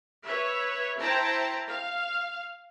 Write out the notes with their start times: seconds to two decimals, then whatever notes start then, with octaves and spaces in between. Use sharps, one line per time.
0.25 B4 C#5 E5
0.98 E4 C5 G5 A5 A#5
1.67 F5